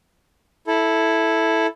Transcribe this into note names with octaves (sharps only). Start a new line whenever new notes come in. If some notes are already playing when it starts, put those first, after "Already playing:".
E4 A4